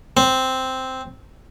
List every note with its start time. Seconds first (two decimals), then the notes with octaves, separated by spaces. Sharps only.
0.17 C4